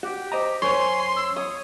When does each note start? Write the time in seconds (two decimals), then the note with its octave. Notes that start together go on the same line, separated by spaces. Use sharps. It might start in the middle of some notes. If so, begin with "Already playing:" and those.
0.03 F#4 G4
0.32 C5 D#5 A#5
0.62 F#2 A#4 C5 C#5 G#5 C6
1.16 E6
1.36 C#5 D#6